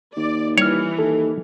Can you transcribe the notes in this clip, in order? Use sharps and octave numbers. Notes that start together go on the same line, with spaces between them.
D#2 D5
E3 G3 C#5 F6
D#2 A4